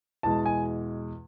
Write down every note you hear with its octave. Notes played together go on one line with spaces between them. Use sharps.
E2 B2 G#3 A5
G#5